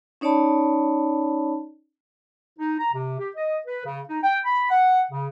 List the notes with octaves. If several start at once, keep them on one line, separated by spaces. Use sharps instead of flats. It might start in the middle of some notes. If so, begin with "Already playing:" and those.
C#4 D#4 C#5 D5 A5 B5
D#4
A#5
C3
G4
D#5
B4
C#3
D#4
G5
B5
F#5
C#3